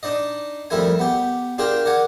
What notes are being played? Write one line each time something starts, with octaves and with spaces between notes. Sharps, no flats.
D4 D#4 D5 D#5
F2 G3 A3 E4 A#4 G#5
B3 G4
D4 F4 G4 G#4 A#4 G5
A#4 D5 F#5 G#5